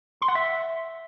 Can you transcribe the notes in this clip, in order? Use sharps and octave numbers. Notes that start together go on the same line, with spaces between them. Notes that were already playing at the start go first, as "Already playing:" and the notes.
C6
F#5
E5